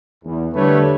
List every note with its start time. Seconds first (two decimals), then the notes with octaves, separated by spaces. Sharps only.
0.24 E2
0.54 D3 G3 A3 A4 B4 C#5